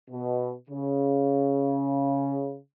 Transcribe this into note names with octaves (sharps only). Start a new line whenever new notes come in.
B2
C#3